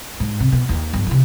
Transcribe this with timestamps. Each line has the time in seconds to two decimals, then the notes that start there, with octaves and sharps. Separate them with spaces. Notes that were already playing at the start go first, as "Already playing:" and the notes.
0.20 G#2
0.40 C3
0.52 B2
0.69 D#2 D#3
0.93 G1 F3
1.07 C3 E3